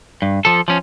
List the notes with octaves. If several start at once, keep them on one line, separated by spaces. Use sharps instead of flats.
G2
F3 A4
F3 C#4